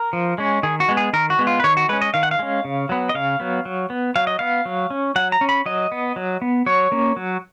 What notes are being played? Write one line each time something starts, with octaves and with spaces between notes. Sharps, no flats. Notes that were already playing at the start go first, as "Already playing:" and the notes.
Already playing: A#4
F3
G#3 C#4
D#3 G#4
F#4
G#3 B3
G#4
D#3 A#4
F#4
G#3 B3
F4
B4
D#3 C#5
F#4
G#3 C#4 B4
D#5
D#3 F5
F#5
F5
G#3 C#4
C#3
F#3 B3
D#5
C#3 F5
F#3 B3
F#3
B3
F#3 F5
D#5
B3 F5
F#3
C#4
F#3 F#5
A#5
C#4
B5
F#3 D#5
B3
F#3
B3
F#3 C#5
A#3 C#4
F#3